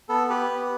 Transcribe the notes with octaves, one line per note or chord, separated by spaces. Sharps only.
B3 A4
G4 B4
B3